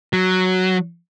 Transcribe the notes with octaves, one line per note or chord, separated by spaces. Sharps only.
F#3